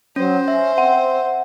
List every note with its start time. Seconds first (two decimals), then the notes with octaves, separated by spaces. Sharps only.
0.16 F#3 C#4 C5
0.48 C#4 E5
0.78 C4 F#5